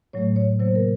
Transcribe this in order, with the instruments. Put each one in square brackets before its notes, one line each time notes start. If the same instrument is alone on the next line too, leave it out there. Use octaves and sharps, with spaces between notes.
[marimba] A2 F#3 A3 C#5
C#5
C3 F#3 A#3 C5
A#4